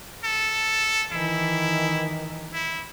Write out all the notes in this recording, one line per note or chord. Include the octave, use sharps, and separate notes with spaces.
A4
D#3 E3 E4
E4